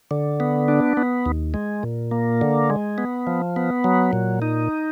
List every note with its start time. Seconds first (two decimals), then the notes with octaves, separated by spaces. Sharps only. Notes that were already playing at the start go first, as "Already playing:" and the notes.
0.11 D3
0.40 B3
0.68 D4
0.97 B3
1.26 D#2
1.54 G#3
1.83 A#2
2.11 A#3
2.41 D3
2.70 G#3
2.98 B3
3.27 F3
3.56 B3
3.84 F#3
4.13 A#2
4.42 D#4